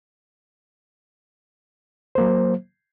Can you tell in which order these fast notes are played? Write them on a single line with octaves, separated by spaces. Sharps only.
C5 A#3 F#3